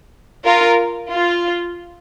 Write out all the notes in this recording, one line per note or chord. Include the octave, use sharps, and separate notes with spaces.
F4 A#4
F4